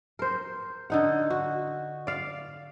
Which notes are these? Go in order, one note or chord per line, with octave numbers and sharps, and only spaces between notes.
A#4 C5
D3 D#4 F#5
F#4
D5 F5